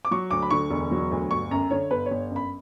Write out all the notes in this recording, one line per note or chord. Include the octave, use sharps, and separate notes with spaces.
D6
F#3 C#6
D2 D6
B5
D3 C#6
E1
F#3
D2
G1 C#6
F#2 A#5
D3 C#5
G1 B4
C#5
G1
F#2
B5